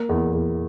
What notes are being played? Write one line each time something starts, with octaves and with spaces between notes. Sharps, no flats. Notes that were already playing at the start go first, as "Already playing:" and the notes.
Already playing: A#3
E2
E2